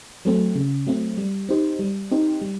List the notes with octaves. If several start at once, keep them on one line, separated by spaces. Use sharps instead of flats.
F#3 A3 C4
C#3
F#3 A3 C4
G3
C4 D#4 G4 C5
G3
C4 D#4 G4 C5
G3